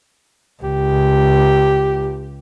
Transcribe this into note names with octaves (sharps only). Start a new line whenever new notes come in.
C#2 G4